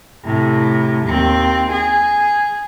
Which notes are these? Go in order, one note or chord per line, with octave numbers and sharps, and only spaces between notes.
A2 C3
D#2 C4
G#4